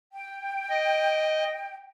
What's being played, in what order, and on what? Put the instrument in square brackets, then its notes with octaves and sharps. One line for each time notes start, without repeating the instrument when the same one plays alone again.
[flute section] G5
[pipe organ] D#5